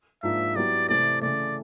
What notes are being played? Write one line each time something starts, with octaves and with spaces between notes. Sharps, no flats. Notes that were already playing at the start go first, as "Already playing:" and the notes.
G#2 F3 A#3 D4 F4 E5
F#3 B3 E4 G4 D5
C3 E3 A3 C4 D5
C#3 E3 A3 D5